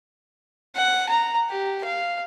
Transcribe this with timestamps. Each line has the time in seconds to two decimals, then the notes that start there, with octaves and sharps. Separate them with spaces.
0.76 F#5
1.09 A#5
1.49 G4
1.84 F5